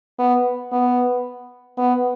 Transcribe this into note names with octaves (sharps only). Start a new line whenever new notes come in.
B3
B3
B3